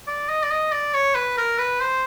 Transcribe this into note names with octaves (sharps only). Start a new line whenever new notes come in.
D5
D#5
D5
D#5
D5
C#5
B4
A#4
B4
C5